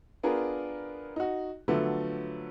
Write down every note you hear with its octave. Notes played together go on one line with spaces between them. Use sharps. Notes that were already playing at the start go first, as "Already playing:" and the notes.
B3 D4 F4 G#4 A#4
D#4 F#4
D3 F3 F#3 A3 B3